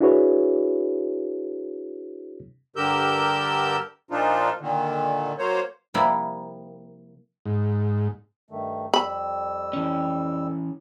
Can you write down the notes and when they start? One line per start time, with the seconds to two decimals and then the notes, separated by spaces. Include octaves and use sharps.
0.01 D4 E4 F#4 G#4 B4 C#5
2.76 G2 D3 G4 A#4 E6 G6
4.11 A#2 F3 D4 D#4 F4
4.61 A#2 D3 D#3
5.39 F#3 A#3 C5 C#5
5.94 C3 F3 G3 A#3 E4
7.46 G#2
8.51 G2 D#3 A3
8.94 F2 G3 B5 E6
9.73 E3 C#4